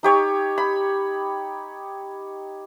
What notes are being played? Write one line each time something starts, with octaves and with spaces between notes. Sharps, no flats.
D#4 G4 C#5
B5